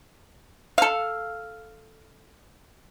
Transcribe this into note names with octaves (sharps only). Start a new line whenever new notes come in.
A4 F5